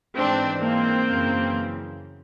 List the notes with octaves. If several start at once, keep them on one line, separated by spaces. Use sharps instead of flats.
G#2 E3 C4 D4
A#3 C4
F#2 C#3 E3